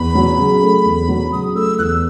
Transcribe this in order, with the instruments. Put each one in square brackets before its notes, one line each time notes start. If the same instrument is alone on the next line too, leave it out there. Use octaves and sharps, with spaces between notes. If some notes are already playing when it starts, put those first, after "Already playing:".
Already playing: [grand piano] E2 [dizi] B5
[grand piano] F#3
C#3
A3
E2
F#3
[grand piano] C#3 [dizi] D#6
[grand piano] A3 [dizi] E6
[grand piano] E2 [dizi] F#6
[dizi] E6